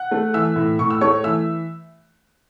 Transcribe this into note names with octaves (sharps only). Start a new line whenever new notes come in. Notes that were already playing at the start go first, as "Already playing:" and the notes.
Already playing: F#5 F#6
A3
E3 E5 E6
A2
A2 C#6
E6
A3 C#5 C#6
E3 E5 E6